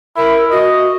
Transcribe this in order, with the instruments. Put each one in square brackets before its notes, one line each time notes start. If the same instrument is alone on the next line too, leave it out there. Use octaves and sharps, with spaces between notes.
[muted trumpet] E4 [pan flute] A#4
[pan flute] F#4 [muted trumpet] D#5